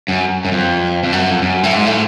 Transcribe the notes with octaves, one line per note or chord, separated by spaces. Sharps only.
F#2
F#2
F2
F2
F#2
F2
F#2
A2
G#2
A2